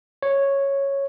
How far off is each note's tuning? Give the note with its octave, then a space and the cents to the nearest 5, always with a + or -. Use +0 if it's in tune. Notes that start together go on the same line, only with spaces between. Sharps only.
C#5 -5